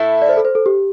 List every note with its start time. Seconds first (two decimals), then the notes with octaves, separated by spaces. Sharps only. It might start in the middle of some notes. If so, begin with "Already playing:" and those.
Already playing: A2 A3 E4
0.22 D5
0.29 C5
0.37 A4
0.45 C5
0.55 A4
0.66 G4